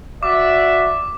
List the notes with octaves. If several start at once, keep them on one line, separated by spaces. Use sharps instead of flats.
F#4 D5 E5 D6